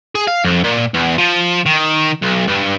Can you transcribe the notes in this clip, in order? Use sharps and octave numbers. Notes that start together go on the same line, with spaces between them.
G#4
F5
F2
A#2
E2
F3
D#3
B1
G2